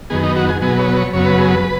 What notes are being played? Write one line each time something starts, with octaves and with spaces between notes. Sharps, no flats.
F#2 D#3 B3 G#4
D#4
F#4
G#4
B2 F#3 B3 G#4
C#5
C#5
F#2 C#3 F#3 B3 C#5
B4
G#4
B4